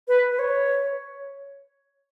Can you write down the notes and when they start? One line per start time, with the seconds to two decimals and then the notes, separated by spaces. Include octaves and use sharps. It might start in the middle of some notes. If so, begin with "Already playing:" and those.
0.08 B4
0.31 B4
0.39 C#5